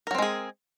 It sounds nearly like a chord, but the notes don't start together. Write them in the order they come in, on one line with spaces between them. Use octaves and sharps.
A#4 F#3 C4 G#3 G#4